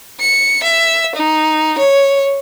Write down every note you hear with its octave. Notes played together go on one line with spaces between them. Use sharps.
C#7
E5
D#4
C#5